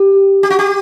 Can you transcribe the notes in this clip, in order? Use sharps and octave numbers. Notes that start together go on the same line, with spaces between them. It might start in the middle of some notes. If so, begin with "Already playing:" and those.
Already playing: G4
G4
F#4
G4